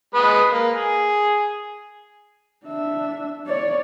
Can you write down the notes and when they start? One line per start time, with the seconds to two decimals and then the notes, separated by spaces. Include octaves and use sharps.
0.15 G#3 B4 D#6
0.52 A#3
0.71 G#4
2.66 D4 E5
3.47 C#5 D5